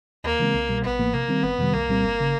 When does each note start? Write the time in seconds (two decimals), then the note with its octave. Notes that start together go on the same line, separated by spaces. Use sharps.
0.24 D#2 A#3
0.39 C#3 E3 G#3 C4
0.54 C2
0.69 B2 G3
0.84 A1 B3
0.99 A2 F3 A#3
1.13 C3 A#3
1.28 D#3 G3 C4
1.44 G1 B3
1.59 F2 C3 D#3 G3
1.74 C2 A#3
1.89 A#2 G3 C4
2.04 G1
2.20 C#3